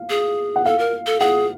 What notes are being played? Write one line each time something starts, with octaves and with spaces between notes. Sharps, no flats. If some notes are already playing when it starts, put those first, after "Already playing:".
Already playing: F5
G#4
F#5
A4 F5
A#4
A4
G#4 F#5